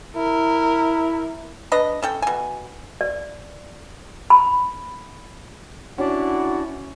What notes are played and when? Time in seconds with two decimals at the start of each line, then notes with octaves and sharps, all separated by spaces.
0.17 E4 A#4
1.72 D4 B4 D#5
2.02 C#4 A4 G5
2.22 B2 G#5
3.01 D5
4.30 B5
5.98 C#4 D4 E4 F#4